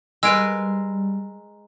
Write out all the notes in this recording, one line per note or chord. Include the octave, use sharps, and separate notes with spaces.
G3 G#3 A#4 B4 E6 D7